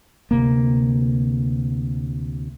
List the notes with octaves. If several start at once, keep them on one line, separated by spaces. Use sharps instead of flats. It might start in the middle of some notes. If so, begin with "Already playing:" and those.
D2 C3 A#3